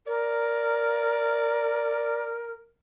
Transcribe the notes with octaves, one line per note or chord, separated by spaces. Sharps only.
A#4 D5